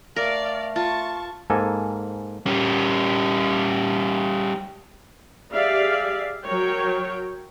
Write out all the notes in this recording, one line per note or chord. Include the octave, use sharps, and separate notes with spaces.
A3 A#4 D5 F5
F4 A5 C#6
G#2 A#3 A4 G#5
G3 C#4
G4 G#4 D5 E5 F5
F#3 A#4 C#5 G5